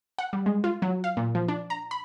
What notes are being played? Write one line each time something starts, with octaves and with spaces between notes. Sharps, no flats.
F#5
G3
G#3
F4
F#3
F5
A#2
F3
D4
A#5
B5